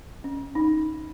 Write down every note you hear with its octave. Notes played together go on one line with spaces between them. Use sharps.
C#4
D#4